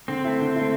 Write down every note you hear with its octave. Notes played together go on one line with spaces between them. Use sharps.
D3 C4
A3 E4
D3
A3 E4